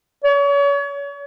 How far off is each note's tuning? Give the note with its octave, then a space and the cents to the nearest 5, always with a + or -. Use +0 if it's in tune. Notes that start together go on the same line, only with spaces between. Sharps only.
C#5 +35